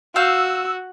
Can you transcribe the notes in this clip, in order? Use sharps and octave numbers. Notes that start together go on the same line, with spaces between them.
F#4 F5 E6 G6